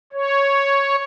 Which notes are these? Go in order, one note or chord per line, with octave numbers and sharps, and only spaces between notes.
C#5